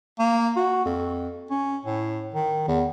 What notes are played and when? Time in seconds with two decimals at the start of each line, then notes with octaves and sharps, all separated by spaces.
0.19 A#3
0.56 F#4
0.86 F2
1.50 C#4
1.86 A2
2.34 D#3
2.68 E2